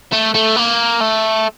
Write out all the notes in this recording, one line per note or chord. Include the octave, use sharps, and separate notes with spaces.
A3
A3
A#3
A3